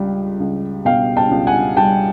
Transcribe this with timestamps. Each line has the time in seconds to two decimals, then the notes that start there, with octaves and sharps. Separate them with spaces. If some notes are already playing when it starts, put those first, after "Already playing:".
Already playing: C#2 G3
0.40 C#2
0.85 B2 F5 G5
1.17 G5 A5
1.31 C#2
1.47 F#5 G#5
1.77 G3 G5 A5